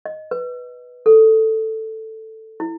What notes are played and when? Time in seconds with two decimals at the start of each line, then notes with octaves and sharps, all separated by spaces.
0.06 D#5
0.31 B4
1.06 A4
2.60 E4